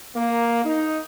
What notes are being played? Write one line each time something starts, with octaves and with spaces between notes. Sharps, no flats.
A#3
D#4